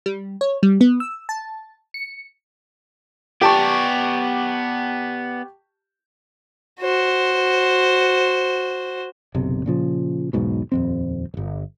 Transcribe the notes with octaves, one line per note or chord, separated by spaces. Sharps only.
G3
C#5
G3
B3
E6
A5
C#7
B3 G4 D5 A5 C#6
F#4 C5
F#1 B1 C3
A#2 C#3 F3
E1 B1 G#2 B2
D#1 F2 C4
D1 G1